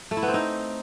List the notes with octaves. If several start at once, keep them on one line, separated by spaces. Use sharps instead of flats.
A3
E4
B3
C4
D#4